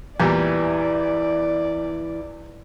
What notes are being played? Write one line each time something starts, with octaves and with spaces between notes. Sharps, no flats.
E2 A#2 E3 G3 D5